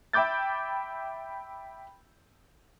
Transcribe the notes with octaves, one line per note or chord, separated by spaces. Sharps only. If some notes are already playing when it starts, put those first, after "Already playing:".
E5 G5 B5 D6 G6 A6